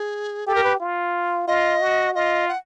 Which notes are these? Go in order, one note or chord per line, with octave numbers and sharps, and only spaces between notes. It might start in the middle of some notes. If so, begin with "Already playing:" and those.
Already playing: G#4
G4 A4
A#4
B4
F4
F4 D#5
F#4
F4 D#5
F#5